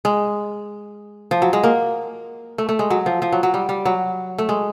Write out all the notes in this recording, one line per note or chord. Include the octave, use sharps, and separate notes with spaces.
G#3
F3
F#3
G#3
A#3
A3
A3
G#3
F#3
F3
F3
F#3
F#3
G3
G3
F#3
A3
G#3